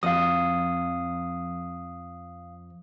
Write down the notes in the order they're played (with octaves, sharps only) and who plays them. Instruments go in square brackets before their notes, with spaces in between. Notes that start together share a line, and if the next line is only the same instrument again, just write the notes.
[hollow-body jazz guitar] F2 [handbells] F5 D#6